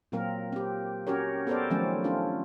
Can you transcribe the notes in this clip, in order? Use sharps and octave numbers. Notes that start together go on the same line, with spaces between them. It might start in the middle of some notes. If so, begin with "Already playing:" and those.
A#2 F#3 A#3 C4 A#4
C4 G4
C#4 F#4 G4 A#4 C#5
B3 A4 A#4 C5 D5
D#3 F3 F#3 A3 C4 C#4
C#4 D4 F4